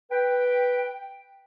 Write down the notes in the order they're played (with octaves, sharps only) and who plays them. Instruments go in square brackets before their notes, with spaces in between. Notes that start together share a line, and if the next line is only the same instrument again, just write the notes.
[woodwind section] B4 G5